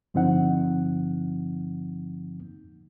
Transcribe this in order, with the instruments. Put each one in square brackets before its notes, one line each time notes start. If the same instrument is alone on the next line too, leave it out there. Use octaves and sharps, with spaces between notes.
[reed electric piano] G2 D3 F3 C4 D#4 F#5